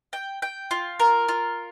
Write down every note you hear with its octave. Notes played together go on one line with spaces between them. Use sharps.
G5
G5
F4
A#4
F4